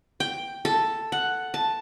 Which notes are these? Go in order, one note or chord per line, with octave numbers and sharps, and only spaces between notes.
G5
A4
F#5
A5